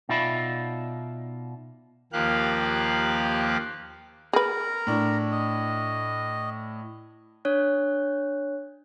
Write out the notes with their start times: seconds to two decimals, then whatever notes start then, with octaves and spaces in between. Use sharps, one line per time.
0.09 B2 D#4 F4 D5 E5 B5
2.13 D#2 F3 A#3 G4 F5 F#6
4.33 G#4 A#4 B4 A#5
4.87 A2 D4
5.31 D#5
7.45 D4 C#5 F#6